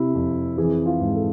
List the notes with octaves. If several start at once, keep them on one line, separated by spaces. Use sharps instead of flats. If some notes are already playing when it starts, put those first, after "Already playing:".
Already playing: C3 E4
F2
E3 G#4
F4
G#2
A4